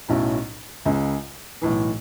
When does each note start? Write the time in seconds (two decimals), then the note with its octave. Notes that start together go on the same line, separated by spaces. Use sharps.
0.08 B1 A2 F#3 C#4 E4
0.86 C#2 C#3 G#3
1.62 B1 A2 E3